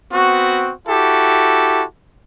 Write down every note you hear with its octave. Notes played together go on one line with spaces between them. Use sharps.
B3 C4 F#4
E4 F#4 G4 A4